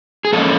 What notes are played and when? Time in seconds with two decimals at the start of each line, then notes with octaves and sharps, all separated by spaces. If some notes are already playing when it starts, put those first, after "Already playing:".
0.25 G#4
0.33 A#2 F3 A#3 C#4 A4